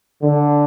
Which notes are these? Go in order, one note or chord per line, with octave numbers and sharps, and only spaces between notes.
D3